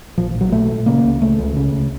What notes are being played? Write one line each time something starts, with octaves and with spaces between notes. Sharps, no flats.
A#1 F3
A#1
F#3
A#2 A3
A#2
C#3 A#3
C#2
C#3 A3
C#2
C#3
C#2